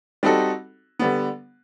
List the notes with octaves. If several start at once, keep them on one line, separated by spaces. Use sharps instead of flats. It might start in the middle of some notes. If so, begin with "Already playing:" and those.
G3 C4 D#4 F#4 A4
D3 G3 B3